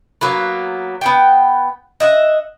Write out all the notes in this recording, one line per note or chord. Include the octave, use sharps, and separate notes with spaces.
F#3 A#3 B3
B3 F#5 G5
D#5 E5 F#5